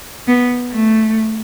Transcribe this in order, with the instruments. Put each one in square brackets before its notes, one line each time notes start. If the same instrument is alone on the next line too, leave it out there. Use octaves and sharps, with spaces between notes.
[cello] B3
A3